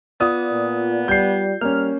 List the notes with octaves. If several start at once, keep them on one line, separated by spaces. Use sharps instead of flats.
B3 F4 D5 D#6
A#2
G3 G6 C7
G3 A#3 C#4 F6